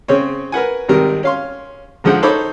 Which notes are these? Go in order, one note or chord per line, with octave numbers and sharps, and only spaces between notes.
C#3 C4 C#4 C#5
A#4 B4 F#5 G#5
G#1 C3 D#3 G3 A#4
C#4 F5 C6
G#2 D3 F3 G#3 F#5
D#4 A4 C5 C#5 B5 D6